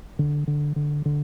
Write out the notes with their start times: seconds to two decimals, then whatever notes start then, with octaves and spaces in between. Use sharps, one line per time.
0.19 D3
0.47 D3
0.76 D3
1.05 D3